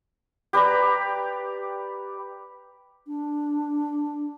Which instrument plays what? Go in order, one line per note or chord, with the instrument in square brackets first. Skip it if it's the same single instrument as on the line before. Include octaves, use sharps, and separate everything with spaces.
[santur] G4 B4 D5 A#5
[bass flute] D4